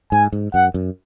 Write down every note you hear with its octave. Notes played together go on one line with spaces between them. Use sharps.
G#2 G#5
G#2
F#2 F#5
F#2